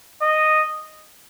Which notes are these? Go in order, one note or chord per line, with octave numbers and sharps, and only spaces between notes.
D#5